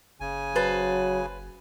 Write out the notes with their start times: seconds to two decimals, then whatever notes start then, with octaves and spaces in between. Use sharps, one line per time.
0.20 F#1 C#3 G#5
0.56 F#3 B4 C5 A5